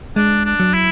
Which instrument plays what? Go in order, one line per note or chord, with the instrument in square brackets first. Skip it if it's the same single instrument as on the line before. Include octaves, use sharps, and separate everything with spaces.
[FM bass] G#3 [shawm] D4
[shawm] D4
[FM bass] F#3
[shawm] E4